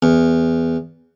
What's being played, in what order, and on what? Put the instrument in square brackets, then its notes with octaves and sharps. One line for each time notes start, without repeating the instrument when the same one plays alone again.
[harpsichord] E2